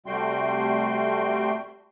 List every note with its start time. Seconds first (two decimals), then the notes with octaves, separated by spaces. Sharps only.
0.06 C3 G3 A3 F#4 G5 C6